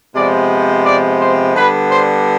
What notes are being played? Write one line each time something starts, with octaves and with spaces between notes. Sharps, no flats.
C3 F3 G#3 B3 D5
D5
C5
D3 G3 B3 B4
C5